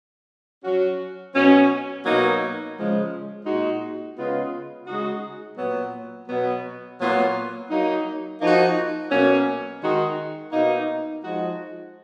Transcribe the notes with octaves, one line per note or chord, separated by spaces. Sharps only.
F#3 C#4 F#4
B2 F#3 C#4
B2 F#3 A#3 D#4
C#3 F3 G#3
A#2 G#3 D#4 F#4
C#3 G#3 B3 F4
C#3 G#3 D#4 F#4
A#2 F#3 B3
B2 F#3 B3
A#2 F#3 B3 F4
F#3 A#3 D#4
F3 A#3 D#4 F#4
B2 F#3 A#3 C#4
D#3 G#3 D#4 F#4
B2 A#3 D#4
F3 G#3 D#4 F#4